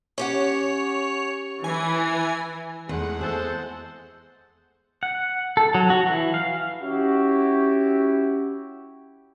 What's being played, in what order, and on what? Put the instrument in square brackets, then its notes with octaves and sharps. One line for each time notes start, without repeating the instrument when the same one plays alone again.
[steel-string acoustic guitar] C#4 G4 F#5 [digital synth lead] C#5
[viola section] E3 [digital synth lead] G#5
[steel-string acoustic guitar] E2 [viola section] G#3 A3 F#5
[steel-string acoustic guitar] G#4 [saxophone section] A4 C5
[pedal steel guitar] F#5
A4
F#3
F#4
E3
F5
[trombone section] C#4 E4 F#4 G4